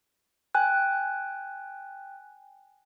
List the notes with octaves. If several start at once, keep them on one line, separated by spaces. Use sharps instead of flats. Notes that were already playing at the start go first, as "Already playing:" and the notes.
G5 G#5 F#6